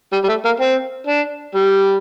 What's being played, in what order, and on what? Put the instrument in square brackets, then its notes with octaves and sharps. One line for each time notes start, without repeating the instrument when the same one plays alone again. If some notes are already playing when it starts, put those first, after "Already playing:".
[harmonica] G3
G3
A3
A#3
C4
D4
G3